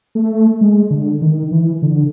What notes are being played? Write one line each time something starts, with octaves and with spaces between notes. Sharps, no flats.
A3
G#3
D3
D#3
E3
D3